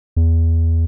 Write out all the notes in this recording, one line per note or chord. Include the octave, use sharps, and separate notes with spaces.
E2